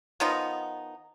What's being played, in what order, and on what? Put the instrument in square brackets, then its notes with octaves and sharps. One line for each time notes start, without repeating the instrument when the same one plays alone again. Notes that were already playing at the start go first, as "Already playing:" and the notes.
[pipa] D#3 F3 B3 D#4